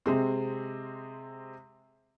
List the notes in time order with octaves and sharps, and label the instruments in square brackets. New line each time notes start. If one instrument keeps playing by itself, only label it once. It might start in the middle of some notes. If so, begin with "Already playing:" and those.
[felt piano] C3 G#3 C4